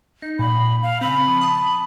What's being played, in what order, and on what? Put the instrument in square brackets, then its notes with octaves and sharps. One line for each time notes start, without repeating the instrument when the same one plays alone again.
[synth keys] D#4
[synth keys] A#2 [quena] B5
[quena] F5
[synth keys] C#3 C4 [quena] B5
[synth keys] F3
A5 D#6